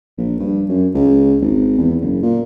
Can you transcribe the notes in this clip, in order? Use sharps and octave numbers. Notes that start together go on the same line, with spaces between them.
A#1
G2
F#2
C#2
G#1
E2
F#1
A#2